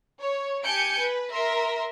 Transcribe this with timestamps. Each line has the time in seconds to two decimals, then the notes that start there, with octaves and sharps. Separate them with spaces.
0.18 C#5
0.64 G4 G#5 A5 G6 C#7 D7
0.99 B4
1.32 A#4 E5 C6